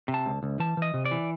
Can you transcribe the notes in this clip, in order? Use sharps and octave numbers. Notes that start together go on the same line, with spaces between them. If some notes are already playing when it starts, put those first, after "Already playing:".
C3
A5
C#2
C#2
E3 A5
E3 D#5
C3
D5
E3